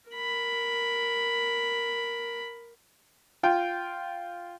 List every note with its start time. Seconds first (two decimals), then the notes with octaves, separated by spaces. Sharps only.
0.11 A#4 B5
3.43 F4 G5